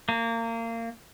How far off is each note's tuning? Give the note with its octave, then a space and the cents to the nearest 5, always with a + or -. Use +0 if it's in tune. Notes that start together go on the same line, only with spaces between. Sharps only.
A#3 -25